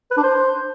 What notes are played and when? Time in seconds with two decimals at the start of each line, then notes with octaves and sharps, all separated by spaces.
0.11 B4
0.17 D4
0.23 C5